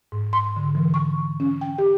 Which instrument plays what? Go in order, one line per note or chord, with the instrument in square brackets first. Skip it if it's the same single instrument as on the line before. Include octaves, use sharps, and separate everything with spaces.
[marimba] G#2
C6
D3
E3
C#6
C#4
G5
G4